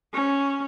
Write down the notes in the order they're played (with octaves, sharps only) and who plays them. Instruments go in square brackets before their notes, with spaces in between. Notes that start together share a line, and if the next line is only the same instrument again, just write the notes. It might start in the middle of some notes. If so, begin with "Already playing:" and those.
[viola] C#4